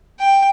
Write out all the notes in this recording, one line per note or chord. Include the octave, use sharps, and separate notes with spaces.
G5